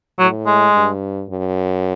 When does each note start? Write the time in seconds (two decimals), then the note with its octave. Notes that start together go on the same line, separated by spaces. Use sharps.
0.19 A2 F#3
0.46 G#3
0.75 G2
1.30 F#2